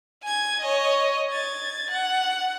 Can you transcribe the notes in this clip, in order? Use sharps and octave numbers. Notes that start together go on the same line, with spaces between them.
G#5 G#6
C#5 D#5
G#6 A6
F#5